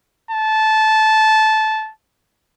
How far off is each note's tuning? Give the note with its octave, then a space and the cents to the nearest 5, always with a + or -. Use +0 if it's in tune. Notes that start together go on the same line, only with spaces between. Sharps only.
A5 -15